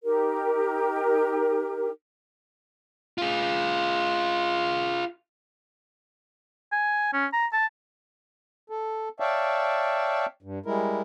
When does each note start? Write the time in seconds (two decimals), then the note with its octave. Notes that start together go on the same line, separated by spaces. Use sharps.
0.04 D#4 G4 A#4
3.18 F4 G#4
6.72 G#5
7.13 C#4
7.33 A#5
7.53 A5
8.70 A4
9.20 C#5 D5 E5 F5 G5 A5
10.42 G2
10.66 G3 G#3 E4 A#4